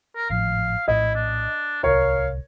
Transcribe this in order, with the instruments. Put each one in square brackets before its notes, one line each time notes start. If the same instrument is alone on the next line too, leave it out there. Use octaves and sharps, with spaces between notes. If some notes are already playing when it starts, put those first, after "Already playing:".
[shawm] A#4
[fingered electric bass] G#1 A2 F3 [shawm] F5
[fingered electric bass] A#1 A2 [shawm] E4 [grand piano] D#5
[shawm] D4
[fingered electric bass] D1 C2 [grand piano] A#4 C#5 [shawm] F5